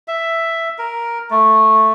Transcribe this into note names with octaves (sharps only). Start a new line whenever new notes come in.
E5
A#4
A3